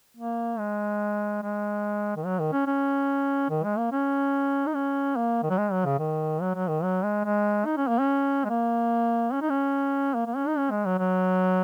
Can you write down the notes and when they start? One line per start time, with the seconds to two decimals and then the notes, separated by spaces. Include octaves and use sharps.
0.17 A#3
0.58 G#3
1.42 G#3
2.16 D#3
2.25 F#3
2.39 D#3
2.52 C#4
2.67 C#4
3.50 D#3
3.64 G#3
3.78 A#3
3.92 C#4
4.67 D#4
4.75 C#4
5.16 A#3
5.43 D#3
5.50 F#3
5.58 G#3
5.72 F#3
5.85 C#3
5.99 D#3
6.41 F#3
6.55 F#3
6.69 D#3
6.83 F#3
7.04 G#3
7.25 G#3
7.65 D#4
7.77 C#4
7.88 A#3
7.99 C#4
8.44 G#3
8.49 A#3
9.32 C#4
9.42 D#4
9.50 C#4
10.15 A#3
10.26 A#3
10.36 C#4
10.47 D#4
10.57 C#4
10.71 G#3
10.85 F#3
10.99 F#3